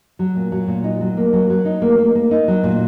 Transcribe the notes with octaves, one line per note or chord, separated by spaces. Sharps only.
F#3
A#2
F#3
A#2
D#4
F#3
A#3
F#3
F#3
D#4
A#3
A#3
A#3
D#4
F#3
A#2